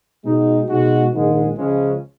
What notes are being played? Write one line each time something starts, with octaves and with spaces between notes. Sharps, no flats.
B2 G#3 D#4 F#4
B2 G#3 D#4 F#4
A#1 G#2 D#3 G#3
C#2 C#3 F3 G#3 C#4